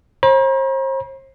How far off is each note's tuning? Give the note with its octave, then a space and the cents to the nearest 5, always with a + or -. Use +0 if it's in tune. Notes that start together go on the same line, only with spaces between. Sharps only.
C5 +40 A#5 +45